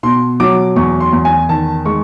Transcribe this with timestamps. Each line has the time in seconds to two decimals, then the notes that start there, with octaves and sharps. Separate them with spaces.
0.03 B2 C6
0.40 F#3 D6
0.76 E2 C#6
1.00 C6
1.13 E2
1.25 G#5
1.49 D#3 A5
1.86 G#3 C#6